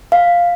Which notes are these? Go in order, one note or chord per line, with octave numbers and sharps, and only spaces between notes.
F5